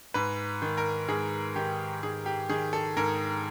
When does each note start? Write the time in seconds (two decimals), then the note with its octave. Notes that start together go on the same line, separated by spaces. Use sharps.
0.14 G#2 B4
0.62 D#3
0.77 A#4
1.08 G#2 G#4
1.56 D#3 G4
2.03 G#2 G#4
2.26 G4
2.49 D#3 G#4
2.73 A4
2.97 G#2 A#4